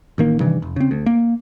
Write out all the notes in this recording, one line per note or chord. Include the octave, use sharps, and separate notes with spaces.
A1 D#3 A#3
G2 C3 D#3 E3
F1
C#3 C4
D2
A#3